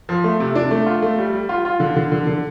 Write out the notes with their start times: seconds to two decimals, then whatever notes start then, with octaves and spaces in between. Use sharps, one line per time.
0.09 F3
0.24 A3
0.40 C3
0.55 D4
0.71 A3
0.86 F4
1.02 A3
1.18 G3
1.33 G3
1.49 F4
1.65 F4
1.80 D3
1.96 D3
2.12 D3
2.27 D3